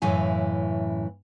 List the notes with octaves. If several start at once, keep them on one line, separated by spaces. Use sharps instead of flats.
F#2 A2 C#3 E3 G#5